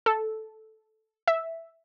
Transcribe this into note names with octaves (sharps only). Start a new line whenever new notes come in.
A4
E5